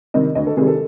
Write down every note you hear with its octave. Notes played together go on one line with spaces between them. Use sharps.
C3 D#3 G3 D#5
D2 D#5
A4
C3 D#3 G3 G#4
A4